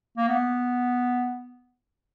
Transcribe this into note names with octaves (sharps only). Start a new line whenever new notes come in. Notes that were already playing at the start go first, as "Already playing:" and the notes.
A#3
B3